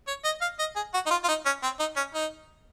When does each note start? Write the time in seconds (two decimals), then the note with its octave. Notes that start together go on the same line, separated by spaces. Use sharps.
0.08 C#5
0.24 D#5
0.41 F5
0.59 D#5
0.76 G#4
0.94 F#4
1.06 D#4
1.10 F4
1.24 F4
1.28 D#4
1.46 C#4
1.63 C4
1.79 D#4
1.96 C#4
2.14 D#4